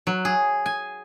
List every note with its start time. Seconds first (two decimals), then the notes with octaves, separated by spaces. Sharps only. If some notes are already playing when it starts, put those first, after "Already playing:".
0.07 F#3
0.25 G#4
0.66 G#5